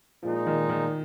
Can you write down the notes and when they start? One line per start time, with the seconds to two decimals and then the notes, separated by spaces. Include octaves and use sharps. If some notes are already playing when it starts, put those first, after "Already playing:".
0.23 A#2 F3 G#3 D#4
0.47 D#3
0.69 D#3